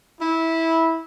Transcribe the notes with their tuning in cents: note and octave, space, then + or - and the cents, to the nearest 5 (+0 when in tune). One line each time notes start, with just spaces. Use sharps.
E4 -15